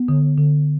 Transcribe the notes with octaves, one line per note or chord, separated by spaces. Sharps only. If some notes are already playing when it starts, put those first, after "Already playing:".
Already playing: B3
D3
D3